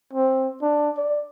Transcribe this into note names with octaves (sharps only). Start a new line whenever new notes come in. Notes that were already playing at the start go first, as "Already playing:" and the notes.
C4
D4
D5